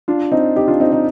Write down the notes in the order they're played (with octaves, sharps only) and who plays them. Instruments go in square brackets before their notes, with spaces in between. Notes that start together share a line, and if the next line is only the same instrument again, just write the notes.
[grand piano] D4 F4
C4 D#4
D#4 G4
D4 F4
C4 D#4
C4 D#4